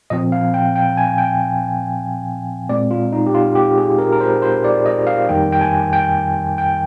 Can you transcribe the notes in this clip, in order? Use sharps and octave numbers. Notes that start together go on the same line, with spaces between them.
A#2 F3 C4 D#5
F5
G5
G5
G#5
G5
A#2 G#3 C4 D5
F4
D#4
G4
F4
G4
G#4
A#4
A#4
C5
C5
D5
D#5
F5
F2 D#3 G3 A#3 G5
G5
G#5
G5
G5